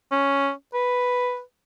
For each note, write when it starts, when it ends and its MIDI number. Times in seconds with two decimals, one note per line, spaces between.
0.12 0.51 61
0.74 1.40 71